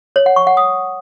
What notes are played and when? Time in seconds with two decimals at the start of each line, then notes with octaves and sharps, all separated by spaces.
0.16 C#5
0.26 F#5
0.36 C#6
0.47 F#5
0.57 D#6